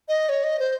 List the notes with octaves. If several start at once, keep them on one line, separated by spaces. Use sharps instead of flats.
D#5
C#5
D#5
C5